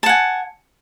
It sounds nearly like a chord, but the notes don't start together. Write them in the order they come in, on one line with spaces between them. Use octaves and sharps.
A5 F#5 G#5